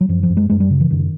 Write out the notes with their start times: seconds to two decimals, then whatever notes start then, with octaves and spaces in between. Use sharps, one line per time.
0.01 F#3
0.09 F#2 F3
0.23 F3
0.30 F#2
0.37 G#3
0.50 F#2 G#3
0.60 G3
0.70 C#3
0.80 E3
0.90 F#2 D#3